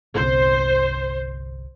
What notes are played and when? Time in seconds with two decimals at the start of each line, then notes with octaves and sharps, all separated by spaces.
0.15 G1 C2 C5